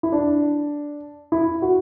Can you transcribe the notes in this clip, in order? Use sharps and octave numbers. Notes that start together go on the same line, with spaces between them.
E4
D4
E4
F#4